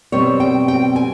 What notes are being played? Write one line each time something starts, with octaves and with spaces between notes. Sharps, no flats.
B2 G3 C4 C#5
G5
G5
G#5